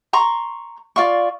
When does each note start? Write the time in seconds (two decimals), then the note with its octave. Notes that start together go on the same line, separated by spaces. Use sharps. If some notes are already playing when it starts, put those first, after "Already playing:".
0.13 A#5 C6 C#6
0.96 F4 D5 F5 C#6